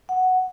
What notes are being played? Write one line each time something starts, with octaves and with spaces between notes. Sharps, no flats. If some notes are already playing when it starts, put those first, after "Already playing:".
F#5